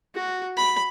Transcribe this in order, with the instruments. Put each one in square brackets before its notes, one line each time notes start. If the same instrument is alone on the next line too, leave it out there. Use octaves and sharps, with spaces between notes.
[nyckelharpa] F#4
B5